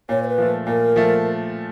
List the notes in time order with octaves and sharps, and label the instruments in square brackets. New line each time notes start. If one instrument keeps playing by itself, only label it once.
[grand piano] A#2 [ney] C#5
[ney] C5
B4
[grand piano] F3 A3
[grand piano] A#2 [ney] A#4
[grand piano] F3 A3